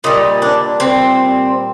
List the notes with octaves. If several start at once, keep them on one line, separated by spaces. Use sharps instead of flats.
A#2 G3 D#4
D4
C4